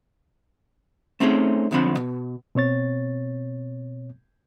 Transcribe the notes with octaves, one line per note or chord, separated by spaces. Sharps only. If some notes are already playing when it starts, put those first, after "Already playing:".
A3 C4 C#4 D#4 G#4
B1 F2 D3 F3 C4 B5
B2
B2 C4 C#5 A6